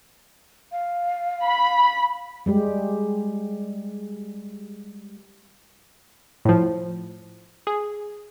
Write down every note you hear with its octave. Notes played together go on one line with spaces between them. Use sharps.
F5
B5
G3 G#3 G4
A2 F3
G#4